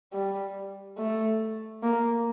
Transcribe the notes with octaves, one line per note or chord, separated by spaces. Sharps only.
G3
A3
A#3